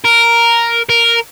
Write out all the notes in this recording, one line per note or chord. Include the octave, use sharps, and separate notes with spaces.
A#4
A#4